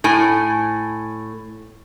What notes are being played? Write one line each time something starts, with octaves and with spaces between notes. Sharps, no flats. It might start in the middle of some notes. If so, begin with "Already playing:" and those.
A2 G#5